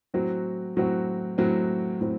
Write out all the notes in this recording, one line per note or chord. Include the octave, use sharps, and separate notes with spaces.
A2 F#3 C4 F#4
A2 F#3 C4 F#4
A2 F#3 C4 F#4
A2 F#3 C4